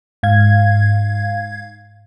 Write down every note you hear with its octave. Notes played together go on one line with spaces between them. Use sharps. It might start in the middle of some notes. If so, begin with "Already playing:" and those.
G#2 F5 G#6